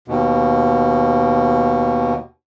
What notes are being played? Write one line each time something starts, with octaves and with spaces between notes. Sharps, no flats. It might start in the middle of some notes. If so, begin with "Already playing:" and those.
D#2 B2